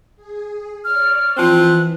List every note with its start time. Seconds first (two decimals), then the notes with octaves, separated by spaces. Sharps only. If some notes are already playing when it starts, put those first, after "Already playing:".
0.17 G#4
0.84 C#5 D5 F6
1.37 E3 F3 C4 F#6